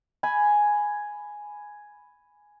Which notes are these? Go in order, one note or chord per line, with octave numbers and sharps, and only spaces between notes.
G#5 B5